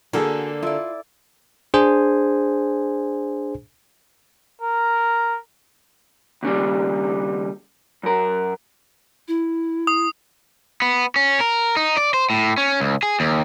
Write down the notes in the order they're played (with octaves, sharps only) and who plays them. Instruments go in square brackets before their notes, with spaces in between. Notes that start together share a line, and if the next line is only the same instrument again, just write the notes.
[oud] D3 [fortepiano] A#3 A4 [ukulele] F#4 G#4
[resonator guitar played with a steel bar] E4 D5 [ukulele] F4
[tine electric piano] D4 G#4 C5 G#5
[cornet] A#4
[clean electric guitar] D#2 C#3 G3
F#2 A#4
[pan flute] E4
[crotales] D#6
[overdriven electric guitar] B3
C#4
A#4
D#4
D5
C5
A2
C#4
C#2
G#4
D#2